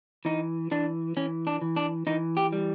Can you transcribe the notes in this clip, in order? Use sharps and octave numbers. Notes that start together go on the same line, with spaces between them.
E3 D#4
E3 D4
E3 C#4
D4
E3
D4
E3 D#4
G4
G3